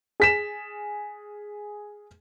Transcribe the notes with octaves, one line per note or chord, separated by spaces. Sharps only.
G#4 B6 E7